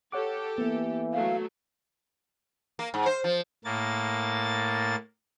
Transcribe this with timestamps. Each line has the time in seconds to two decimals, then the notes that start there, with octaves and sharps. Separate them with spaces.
0.12 G4 A4 C#5 F#5 D6
0.58 E3 A#3 B3
1.13 F#3 A3 F5
2.79 A#3
2.94 G#2
3.06 C5
3.24 F3
3.65 A2 A#3 A6